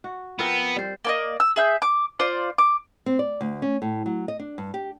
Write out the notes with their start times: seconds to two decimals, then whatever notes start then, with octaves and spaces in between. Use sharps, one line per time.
0.04 F#4
0.39 F3 B3 C4 A#4
0.76 G3 C5
1.05 A#3 D5 D#5
1.40 E6
1.56 G#4 E5 G6
1.82 D6
2.19 F4 C5 D5
2.58 D6
3.06 C4
3.19 D5
3.41 D2
3.62 C#4
3.82 A2
4.06 F#3
4.28 D#5
4.39 D4
4.58 G2
4.74 G4